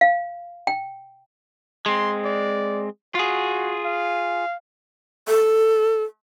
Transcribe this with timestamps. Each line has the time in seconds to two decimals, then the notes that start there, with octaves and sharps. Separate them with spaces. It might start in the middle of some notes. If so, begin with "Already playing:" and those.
0.01 F5
0.67 G5
1.86 G#3 C4 C6
2.25 D5
3.15 F4 F#4 G#4
3.85 F5
5.28 A4